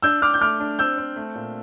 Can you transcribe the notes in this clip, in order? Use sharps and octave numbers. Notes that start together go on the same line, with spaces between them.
D4 E6 G6
D4 D6 F6
G6
A3 D6 F6
D4
C4 E6 G6
C4
A3
A#2